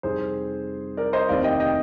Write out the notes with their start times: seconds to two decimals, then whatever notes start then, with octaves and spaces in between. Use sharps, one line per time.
0.03 F2 C3 G3 C4 D#4 G#4 C5
0.97 A#4 D5
1.13 C5 D#5
1.29 F1 D#2 D#3 A#3 D5 F5
1.44 D#5 G5
1.60 D#5 G5